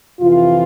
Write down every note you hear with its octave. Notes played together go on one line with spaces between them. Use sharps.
F2 C3 E3 F4